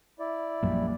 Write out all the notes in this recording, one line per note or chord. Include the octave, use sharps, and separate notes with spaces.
E4 D5
A#1 F#2 F3 G3 A#3